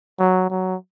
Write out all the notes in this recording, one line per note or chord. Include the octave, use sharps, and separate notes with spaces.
F#3
F#3